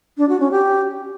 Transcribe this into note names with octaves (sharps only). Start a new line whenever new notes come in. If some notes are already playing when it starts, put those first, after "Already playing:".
D4
F#4
C#4
G4